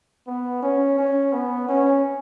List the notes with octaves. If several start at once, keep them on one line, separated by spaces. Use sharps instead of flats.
B3
C#4
C#4
B3
C#4